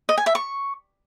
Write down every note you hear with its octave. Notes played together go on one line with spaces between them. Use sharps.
D#5
G#5
E5
C#6